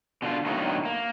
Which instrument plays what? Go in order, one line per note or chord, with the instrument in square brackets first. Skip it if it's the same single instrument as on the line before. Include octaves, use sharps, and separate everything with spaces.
[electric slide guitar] B2 D3 D#4 F4
A2 D3 F#3 A#3 B3 D#4
A#3